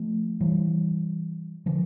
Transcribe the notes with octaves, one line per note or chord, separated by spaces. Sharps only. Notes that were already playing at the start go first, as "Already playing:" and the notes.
Already playing: F3 A3
E3 G3
D3 F3